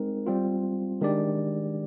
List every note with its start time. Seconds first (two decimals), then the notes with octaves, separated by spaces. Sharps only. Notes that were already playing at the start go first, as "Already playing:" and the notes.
Already playing: G#3 C4 D#4 A#4
0.26 G3 C4 F4
1.01 D#3 G#3 D4 G4 D5